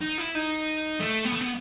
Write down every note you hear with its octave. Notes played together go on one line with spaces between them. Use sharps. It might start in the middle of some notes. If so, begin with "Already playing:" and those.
D#4
E4
D#4
A3
B3
A3
B3